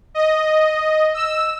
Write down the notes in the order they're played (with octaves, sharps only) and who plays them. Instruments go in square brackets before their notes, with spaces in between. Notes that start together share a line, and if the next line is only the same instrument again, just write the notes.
[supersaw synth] D#5
E6